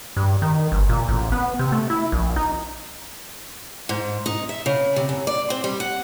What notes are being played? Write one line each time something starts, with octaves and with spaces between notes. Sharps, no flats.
G2
D#3
G1
A#2
A1
B3
C3
A3
E4
A#1
D#4
G#2
D#4
E5
C#3
C3
F#2
D5
C4
G3
F#5